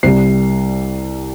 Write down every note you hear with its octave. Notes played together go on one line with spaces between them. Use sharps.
C2 C3 G3 C7